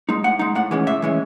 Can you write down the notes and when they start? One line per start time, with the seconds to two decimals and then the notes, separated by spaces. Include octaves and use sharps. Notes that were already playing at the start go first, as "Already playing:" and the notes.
0.09 G#3 D#4
0.24 A2 F#5
0.39 G#3 D#4
0.55 A2 F#5
0.71 E3 G#3 C#4
0.87 A2 E5
1.02 E3 G#3 C#4